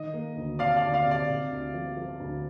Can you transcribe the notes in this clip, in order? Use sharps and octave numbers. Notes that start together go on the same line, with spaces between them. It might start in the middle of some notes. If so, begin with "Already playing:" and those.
Already playing: D#3 D#5
A#3
D2
C3 D5 F5
D5 F5
D2
D5 F5
C3
D5
C3
D2
F3
F3
D2